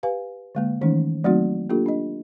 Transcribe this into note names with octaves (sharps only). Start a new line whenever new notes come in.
G4 B4 F5 G#5
D3 G#3 A#3
D#3 E3 G#3 A3 C#4 D#4
F#3 A3 A#3 C4 D#4 F#4
A#3 D4 F4 G4 A4
D4 D#5